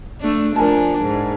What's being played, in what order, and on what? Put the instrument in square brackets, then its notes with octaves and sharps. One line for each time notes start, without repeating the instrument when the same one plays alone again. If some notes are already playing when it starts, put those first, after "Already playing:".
[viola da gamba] A3 D4
[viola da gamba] F3 D4 [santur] A#4 G#5 A5
[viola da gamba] G#2